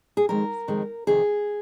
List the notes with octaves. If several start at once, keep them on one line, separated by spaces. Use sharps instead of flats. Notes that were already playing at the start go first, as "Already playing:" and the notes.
G#4
F2 D#3 G#3 A#4
F2 D#3 G#3
F2 C3 D#3 G#4